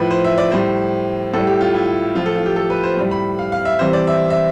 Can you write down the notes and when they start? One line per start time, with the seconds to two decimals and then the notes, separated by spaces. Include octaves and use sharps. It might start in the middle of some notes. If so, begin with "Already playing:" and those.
Already playing: A2 F3 B4
0.11 C5
0.24 E5
0.38 D5
0.52 A2 G3 C5
1.34 A2 G3 A4
1.47 G4
1.61 F4
1.74 E4
2.15 A2 F3 F4
2.26 A4
2.36 F4
2.46 G4
2.56 A4
2.70 B4
2.84 C5
2.97 A2 G3
3.11 B5
3.39 F5
3.52 F5
3.65 E5
3.79 C3 E3 G3 C5
3.93 D5
4.07 E5
4.30 E5